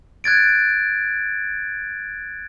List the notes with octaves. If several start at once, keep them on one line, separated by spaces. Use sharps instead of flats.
F#6 G#6 A6 D7